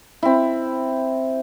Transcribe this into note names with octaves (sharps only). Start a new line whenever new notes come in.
C4 E4